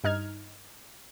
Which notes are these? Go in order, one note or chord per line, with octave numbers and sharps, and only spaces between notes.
G2 D#4 F6 G#6